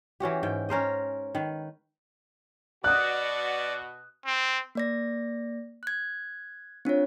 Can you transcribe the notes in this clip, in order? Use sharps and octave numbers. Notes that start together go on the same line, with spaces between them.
E3 C#4 F#4 G4
G#2 G5
C#4 A#4 C5 D#5
D#3 B4
B2 F#4 D5 D#6 F#6
C4
A#3 D5 A#6
F#6 G#6
C4 D4 F4 C#5